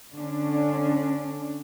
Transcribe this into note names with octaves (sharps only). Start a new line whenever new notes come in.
D3 C#4 D4